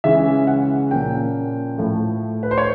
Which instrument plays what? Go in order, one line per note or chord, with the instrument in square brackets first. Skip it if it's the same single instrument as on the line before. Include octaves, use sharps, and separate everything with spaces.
[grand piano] C#3 E3 G#3 C#4 E5
F#5
A#2 F3 A#3 C#4 G5
A2 F3 A3
B4
C5
C#5